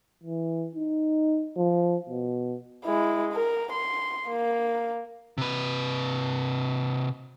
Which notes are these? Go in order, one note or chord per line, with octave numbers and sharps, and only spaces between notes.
E3
D#4
F3
B2
G#3 E4
A#4
C6
A#3
C3 B4